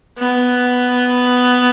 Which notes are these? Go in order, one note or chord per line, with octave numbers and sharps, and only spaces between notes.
B3